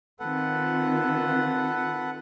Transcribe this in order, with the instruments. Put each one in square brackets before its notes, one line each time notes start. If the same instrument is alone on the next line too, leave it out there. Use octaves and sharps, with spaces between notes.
[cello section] D#3 C4 F4 [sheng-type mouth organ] A4 B4 F#5